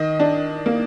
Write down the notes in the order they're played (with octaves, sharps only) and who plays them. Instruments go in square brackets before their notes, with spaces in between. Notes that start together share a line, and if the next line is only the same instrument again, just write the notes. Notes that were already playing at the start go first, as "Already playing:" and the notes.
Already playing: [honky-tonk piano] D#3 D#5
D4
A#3